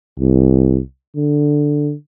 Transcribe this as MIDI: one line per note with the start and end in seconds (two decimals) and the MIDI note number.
0.20 0.80 36
1.16 1.93 50